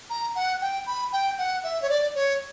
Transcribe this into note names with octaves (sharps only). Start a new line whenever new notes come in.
A#5
F#5
G5
B5
G5
F#5
E5
C#5
D5
C#5